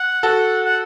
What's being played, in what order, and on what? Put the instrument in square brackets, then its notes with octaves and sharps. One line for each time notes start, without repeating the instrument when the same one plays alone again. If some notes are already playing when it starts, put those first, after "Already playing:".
Already playing: [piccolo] F#5
[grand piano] F#4 A4
[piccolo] F#5